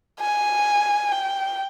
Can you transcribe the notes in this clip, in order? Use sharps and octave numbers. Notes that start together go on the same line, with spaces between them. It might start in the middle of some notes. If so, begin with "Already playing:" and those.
G#5
G5